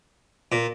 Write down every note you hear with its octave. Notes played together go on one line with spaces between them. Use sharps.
A#2